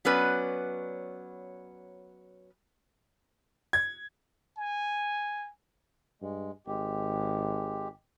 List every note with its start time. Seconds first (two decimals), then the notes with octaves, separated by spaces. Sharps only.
0.05 F#3 B3 C#4 B4 D5
3.73 G#6
4.57 G#5
6.22 G2 G#3
6.67 G#1 G#3 G4